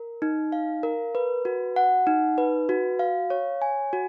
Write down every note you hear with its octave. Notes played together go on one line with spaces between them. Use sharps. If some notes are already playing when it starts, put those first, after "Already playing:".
Already playing: A#4
D#4
F5
A#4
B4
F#4
F#5
D#4
B4
F#4
F5
C#5
G#5
F#4